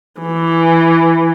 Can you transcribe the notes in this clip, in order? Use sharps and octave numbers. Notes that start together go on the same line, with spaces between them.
E3